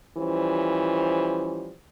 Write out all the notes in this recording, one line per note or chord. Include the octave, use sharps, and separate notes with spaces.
E3 F3 G3 C#4 C5